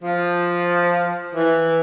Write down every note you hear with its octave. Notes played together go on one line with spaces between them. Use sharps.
F3
E3